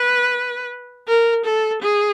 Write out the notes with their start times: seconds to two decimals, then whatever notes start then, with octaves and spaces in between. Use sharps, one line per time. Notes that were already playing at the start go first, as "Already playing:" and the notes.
Already playing: B4
1.08 A#4
1.46 A4
1.82 G#4